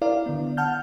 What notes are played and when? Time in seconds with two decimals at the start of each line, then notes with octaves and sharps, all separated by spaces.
0.02 E4 A#4 D5 F5
0.26 D3 B3
0.57 F#5 A5 F6 G6